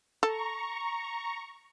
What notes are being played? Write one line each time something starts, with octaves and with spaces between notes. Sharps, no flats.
A4 A#5 C#6